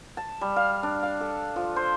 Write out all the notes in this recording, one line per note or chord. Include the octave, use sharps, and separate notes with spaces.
A5
G3
F5
D4
F5
A4
F3
C5